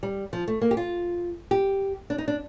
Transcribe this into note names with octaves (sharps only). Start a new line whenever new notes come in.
G3
F3
A3
A#3
G4
F4
G4
D4
D#4
D4